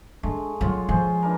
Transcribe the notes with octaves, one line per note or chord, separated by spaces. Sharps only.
G#3 A3 D4
F#3 C#4 F4 C#5 F#5
F3 G#3 C#4 C5
E3 D4 A#4